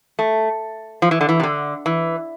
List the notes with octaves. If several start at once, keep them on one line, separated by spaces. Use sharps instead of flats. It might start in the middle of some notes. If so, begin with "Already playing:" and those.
A3
F3
E3
D3
E3
C3
D3
E3